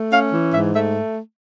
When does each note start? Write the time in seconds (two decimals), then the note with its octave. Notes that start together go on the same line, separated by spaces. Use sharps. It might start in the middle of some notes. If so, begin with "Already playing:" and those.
Already playing: A3
0.12 C#4 F5
0.32 E3
0.54 G#2 E5
0.74 A3 E5